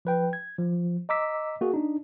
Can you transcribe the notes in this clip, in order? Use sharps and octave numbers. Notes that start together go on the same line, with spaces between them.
F3 B4 G5
G#6
F3
D#5 A#5 D6 E6 B6
A#3 F#4 G#4
D4 D#4